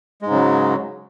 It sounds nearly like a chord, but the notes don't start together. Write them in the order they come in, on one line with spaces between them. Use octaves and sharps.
G#3 G#2 C#3 F#3